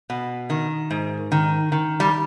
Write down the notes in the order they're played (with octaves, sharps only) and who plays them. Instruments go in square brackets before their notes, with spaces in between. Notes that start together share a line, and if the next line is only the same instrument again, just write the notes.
[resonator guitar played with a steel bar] B2
D#3
G#2
D#3
D#3
G3